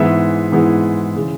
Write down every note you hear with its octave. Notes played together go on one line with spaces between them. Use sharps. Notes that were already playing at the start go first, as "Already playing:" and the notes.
Already playing: G#2 E3 G#3 B3 E4 E5
G#2 E3 G#3 B3 E4
C#3 E3 G#3